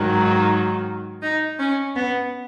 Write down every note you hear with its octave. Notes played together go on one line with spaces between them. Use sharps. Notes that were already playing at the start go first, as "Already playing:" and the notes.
Already playing: G#2 D#3 F#3
D#4
C#4
B3